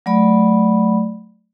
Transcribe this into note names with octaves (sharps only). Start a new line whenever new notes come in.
F#3 A3 D5 B5